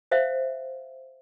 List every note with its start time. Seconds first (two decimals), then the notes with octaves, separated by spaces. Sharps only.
0.11 C5 E5 F5